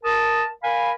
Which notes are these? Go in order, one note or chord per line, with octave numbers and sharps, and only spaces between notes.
A#4 A5 D#6
A#4 F5 G#5 B5